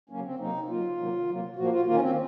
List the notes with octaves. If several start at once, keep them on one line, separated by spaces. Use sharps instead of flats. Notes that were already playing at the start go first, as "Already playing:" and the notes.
C#3 F#3 A#3 C#4
C4
C3 F#3 A#3 D#4
C#3 F#3 A#3 F4
C3 D#3 F#3 A#3
C3 F#3 A#3
A#2 F3 A#3 F#4
F4
D#3 A#3 F4
C#4
C4